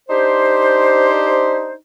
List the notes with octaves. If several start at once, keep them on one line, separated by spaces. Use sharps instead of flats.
D4 D#4 G4 C5